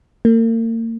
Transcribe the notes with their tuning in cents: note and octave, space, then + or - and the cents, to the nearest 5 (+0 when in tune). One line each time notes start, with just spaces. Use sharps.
A#3 -40